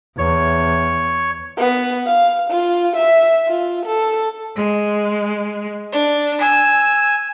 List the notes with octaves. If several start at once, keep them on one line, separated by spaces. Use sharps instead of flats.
E2 C#5
B3
F5
F4
E5
F4
A4
G#3
D4
G#5 E6